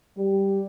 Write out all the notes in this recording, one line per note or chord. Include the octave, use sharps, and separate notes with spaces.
G3